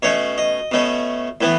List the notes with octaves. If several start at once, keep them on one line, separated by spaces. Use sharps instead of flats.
B2 A3 C#4 C#5
D#5
B2 A3 C#4
A2 E3 B3